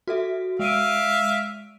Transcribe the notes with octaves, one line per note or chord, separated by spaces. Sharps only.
F#4 A4 E5
G#3 E5 F5 D7 D#7